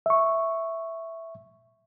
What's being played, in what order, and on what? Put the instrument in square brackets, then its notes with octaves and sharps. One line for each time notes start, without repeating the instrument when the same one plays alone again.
[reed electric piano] E5 C#6